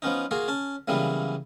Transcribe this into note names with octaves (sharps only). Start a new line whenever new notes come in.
F3 B3 C#4 D#4
A#3 F4 F#4 G#4
C#4 A5
C#3 E3 F#3 G3 A#3 B3